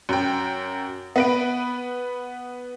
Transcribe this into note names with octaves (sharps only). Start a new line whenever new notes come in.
F#2 G5
B3 B4 D7